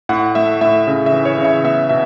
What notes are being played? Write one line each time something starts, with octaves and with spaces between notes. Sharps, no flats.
A2 F#5
A3 E5
A2 E5
C#3
E5
E3
C#5
C#3
E5
B3 E5
B2 E5